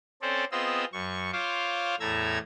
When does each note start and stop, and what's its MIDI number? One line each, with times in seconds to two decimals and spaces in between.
0.22 0.44 60
0.22 0.44 61
0.22 0.44 69
0.22 0.44 72
0.22 0.44 74
0.52 0.85 59
0.52 0.85 60
0.52 0.85 65
0.52 0.85 68
0.52 0.85 75
0.52 0.85 88
0.93 1.31 42
0.93 1.31 85
1.32 1.95 65
1.32 1.95 72
1.32 1.95 73
1.32 1.95 77
1.32 1.95 86
2.00 2.38 40
2.00 2.38 45
2.00 2.38 57
2.00 2.38 82
2.00 2.38 88
2.00 2.38 92